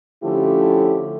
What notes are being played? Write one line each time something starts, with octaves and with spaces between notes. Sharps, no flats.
D3 F3 A3 C#4 E4 G4